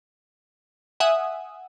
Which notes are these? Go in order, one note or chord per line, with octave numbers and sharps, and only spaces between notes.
E5 F#5 G#5 D#6